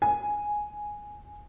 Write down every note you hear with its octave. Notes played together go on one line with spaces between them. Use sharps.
G#5